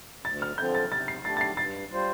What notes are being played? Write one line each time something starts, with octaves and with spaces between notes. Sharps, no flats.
D2 A6
F6
D3 F3 C4 G6
A6
C3 A6
C7
A3 D4 G4 A6
A6
C7
G2 A6
G3 F4 C5